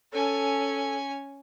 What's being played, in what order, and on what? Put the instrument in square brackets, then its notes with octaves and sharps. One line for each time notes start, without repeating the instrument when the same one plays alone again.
[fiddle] C#4 G#5 [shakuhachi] A4